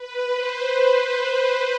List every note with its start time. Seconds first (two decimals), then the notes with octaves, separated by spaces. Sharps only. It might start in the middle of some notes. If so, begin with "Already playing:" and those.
Already playing: B4
0.34 C5
0.75 B4